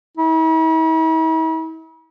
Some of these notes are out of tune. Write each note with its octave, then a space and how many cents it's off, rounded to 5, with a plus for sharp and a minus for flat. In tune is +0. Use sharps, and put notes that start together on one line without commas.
E4 -45